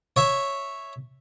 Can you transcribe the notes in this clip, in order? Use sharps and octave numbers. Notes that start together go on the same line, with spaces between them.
C#5 E5